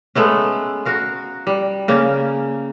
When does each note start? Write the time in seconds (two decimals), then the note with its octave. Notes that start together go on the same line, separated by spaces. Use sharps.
0.15 G#3 A3 B3 C#4
0.85 F#4 A#4 F5
1.47 G3
1.88 C#3 A#3 C#4